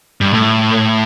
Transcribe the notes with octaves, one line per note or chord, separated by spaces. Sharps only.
G2
A2